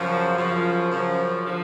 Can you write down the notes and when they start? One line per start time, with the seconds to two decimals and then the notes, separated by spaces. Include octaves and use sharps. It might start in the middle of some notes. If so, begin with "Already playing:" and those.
Already playing: F#2 C#3 F3
0.38 F#2 C#3 F3
0.90 F#2 C#3 F3
1.44 D3 F3